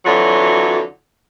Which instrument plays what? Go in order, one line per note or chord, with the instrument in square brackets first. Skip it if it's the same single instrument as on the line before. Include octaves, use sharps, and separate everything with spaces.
[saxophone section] F2 D3 E3 F#3